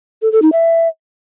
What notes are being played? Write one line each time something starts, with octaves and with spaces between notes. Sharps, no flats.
A4
A4
D#4
E5